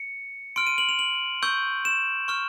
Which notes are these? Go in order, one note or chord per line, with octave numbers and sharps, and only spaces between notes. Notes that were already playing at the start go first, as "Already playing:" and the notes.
Already playing: C#7
C6 F6 D7
D#7
F#7
F7
F#7
C#6 E6 G6
E7
C#6 F6